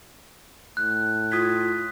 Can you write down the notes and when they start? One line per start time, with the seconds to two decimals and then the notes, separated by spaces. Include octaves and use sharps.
0.77 A2 F#6
1.32 F4 D#6 G#6 B6